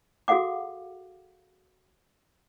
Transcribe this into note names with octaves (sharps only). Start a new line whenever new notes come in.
F#4 G#4 A4 F5 F#5 D6